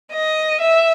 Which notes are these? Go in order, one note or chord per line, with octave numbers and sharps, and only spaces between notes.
D#5
E5